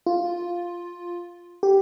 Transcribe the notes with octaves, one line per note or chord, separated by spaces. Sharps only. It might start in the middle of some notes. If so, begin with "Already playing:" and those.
F4
G4